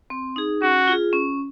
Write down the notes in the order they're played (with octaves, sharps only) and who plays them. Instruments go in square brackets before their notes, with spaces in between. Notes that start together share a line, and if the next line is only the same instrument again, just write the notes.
[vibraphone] C4
D#4 G#4
[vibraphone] C#4 [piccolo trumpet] F#4
[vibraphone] F4 G#4
C#4